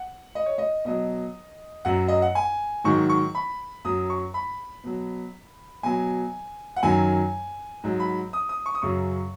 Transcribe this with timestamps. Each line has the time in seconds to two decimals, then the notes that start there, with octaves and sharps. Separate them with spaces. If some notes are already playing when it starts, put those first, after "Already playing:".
Already playing: F#5
0.35 D#5
0.46 C#5
0.58 D#5
0.85 B2 F#3 D#5
1.85 F#2 F#3 F#5
2.08 D#5
2.22 F#5
2.35 G#5
2.84 G#2 D#3 F#3 C#6
3.09 C#6
3.35 B5
3.84 F#2 F#3 D#6
4.10 C#6
4.34 B5
4.84 B2 F#3
5.83 B2 F#3 G#5
6.76 F#5
6.83 F#2 D#3 F#3 G#5
7.84 G#2 F#3
8.00 B5
8.33 D#6
8.49 D#6
8.66 C#6
8.75 D#6
8.82 F#2 C#3 F#3 C#6